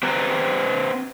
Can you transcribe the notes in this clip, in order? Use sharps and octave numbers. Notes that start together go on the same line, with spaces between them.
C4 G4 B4 A#5